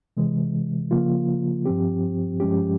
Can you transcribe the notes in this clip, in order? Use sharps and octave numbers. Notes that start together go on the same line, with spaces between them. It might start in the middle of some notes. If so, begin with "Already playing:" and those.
C3 E3 G#3
C#3 F3 A#3 F4
G2 F3 C4 G4
G2 F3 G#3 C#4 G4